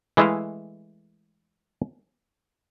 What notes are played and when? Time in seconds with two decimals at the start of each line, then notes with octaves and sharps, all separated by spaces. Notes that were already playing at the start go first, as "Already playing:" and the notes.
0.17 E3 G#3 A3 E4 D#5 F5